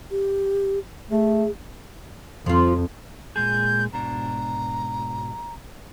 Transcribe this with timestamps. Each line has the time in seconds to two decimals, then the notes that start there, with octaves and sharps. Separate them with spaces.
0.11 G4
1.11 A3 G#4
2.46 F2 F3 F4
3.36 A#2 G#3 G#4 G6
3.93 G#2 B2 D4 A#5